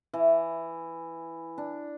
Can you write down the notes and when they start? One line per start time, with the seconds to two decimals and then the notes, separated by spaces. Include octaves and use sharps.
0.13 E3
1.58 D4